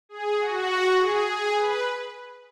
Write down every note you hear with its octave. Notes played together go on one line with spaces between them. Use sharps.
G#4
F#4
G#4
G#4
B4